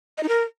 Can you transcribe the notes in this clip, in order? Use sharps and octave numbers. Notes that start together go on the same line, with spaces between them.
D#5
D#4
A#4